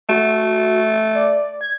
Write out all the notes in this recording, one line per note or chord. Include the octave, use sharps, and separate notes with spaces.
A3 F#4
D5
G#6